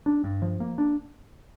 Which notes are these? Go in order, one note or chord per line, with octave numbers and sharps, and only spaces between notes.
D4
G2
F3
A#3
D4